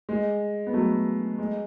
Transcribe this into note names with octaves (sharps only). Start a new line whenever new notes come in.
G#3
B3
F#3 A3
G#3